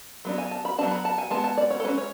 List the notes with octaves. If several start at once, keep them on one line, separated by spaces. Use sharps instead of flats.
F#3 B3 D4
G#5
A5
B5
F#3 B3 D4 A5
B5
A5
G#5
G#3 B3 A5
A5
D5
C#5
A4
G#3 C#4 B4
C#5